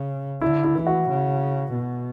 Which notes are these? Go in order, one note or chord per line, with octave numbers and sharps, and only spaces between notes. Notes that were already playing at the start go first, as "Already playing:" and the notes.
Already playing: C#3
D3 E4
E4
E3 E4
F#4
C#3
B2